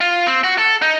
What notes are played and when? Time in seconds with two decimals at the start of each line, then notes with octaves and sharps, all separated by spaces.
0.01 F4
0.27 C4
0.44 F#4
0.58 A4
0.82 D#4